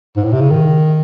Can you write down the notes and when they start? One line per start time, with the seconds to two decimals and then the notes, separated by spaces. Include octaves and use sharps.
0.17 G#2
0.24 A2
0.33 C3
0.41 C#3
0.51 D#3